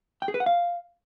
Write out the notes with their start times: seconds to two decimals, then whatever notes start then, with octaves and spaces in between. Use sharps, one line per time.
0.22 G5
0.28 G#4
0.34 B4
0.40 F#5
0.46 F5